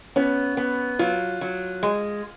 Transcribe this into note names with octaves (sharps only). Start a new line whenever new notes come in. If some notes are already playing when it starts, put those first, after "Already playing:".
B3 C#4
B3
F#3 F4
F#3
G#3